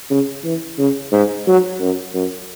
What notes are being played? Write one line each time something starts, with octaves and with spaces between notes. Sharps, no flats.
C#3
E3
C#3
G#2
F#3
F#2
F#2